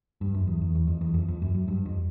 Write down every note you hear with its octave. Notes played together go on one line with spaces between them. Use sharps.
G2
F#2
E2
E2
E2
F2
E2
F2
F2
F#2
F#2
G2
F2